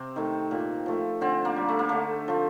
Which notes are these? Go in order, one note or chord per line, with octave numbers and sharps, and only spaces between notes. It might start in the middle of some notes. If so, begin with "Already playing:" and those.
Already playing: C3 C4
D#3 A3
A#2
F3 A3
D3 C4
A#3
G3
A3
A#3
D3 A3
F3 A3